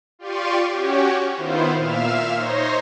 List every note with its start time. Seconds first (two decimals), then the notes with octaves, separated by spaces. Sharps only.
0.19 F4 G4 D5 C6 C#6 D#7
0.70 C#4 F#4 G4 C#5
1.33 D#3 B3 E4 F4 C5
1.73 A#2 E5 F5 F6 E7
2.34 D#4 C5 C#5 C6 A#6